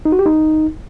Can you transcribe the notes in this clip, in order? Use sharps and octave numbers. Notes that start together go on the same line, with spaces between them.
D#4
F#4
G4
D#4